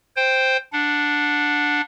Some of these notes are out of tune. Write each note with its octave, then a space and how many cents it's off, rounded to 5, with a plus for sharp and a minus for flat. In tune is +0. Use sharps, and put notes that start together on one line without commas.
C5 +0 G5 +0
D4 +0 F#5 -25